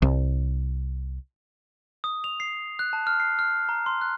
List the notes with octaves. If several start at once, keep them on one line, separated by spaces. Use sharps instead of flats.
C2
D#6
F7
C7
F#6
A5
F6
C7
F6
A#5
C6
F#6